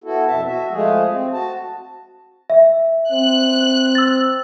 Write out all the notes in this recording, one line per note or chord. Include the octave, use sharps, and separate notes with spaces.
B3 E4 F#4 A4
F2 B2 E5 A5
F#4 E5
F3 G#3 A3 G#4
C4
F#4 A5
E5
C4 F#6
E6 A6